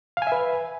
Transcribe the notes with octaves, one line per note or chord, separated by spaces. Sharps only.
B4 E5 F5 G#5